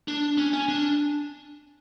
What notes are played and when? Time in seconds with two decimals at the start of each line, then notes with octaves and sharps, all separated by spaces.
0.08 D4
0.38 C#4
0.53 C#4
0.68 D4